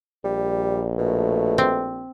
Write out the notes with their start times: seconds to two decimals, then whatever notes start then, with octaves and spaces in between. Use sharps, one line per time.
0.24 A#1 G3
0.98 B2 A3
1.58 C4